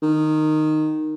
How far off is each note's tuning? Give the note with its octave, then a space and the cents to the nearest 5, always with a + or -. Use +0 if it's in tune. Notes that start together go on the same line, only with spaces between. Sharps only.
D#3 -10